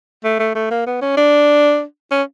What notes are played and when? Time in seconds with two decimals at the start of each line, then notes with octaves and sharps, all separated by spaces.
0.24 A3
0.40 A3
0.55 A3
0.71 A#3
0.86 B3
1.01 C#4
1.17 D4
2.11 C#4